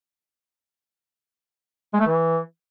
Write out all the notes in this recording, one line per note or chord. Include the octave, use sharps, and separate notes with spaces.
G#3
A3
E3